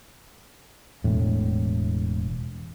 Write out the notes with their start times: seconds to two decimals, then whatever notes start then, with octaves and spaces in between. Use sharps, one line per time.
1.04 E1 A2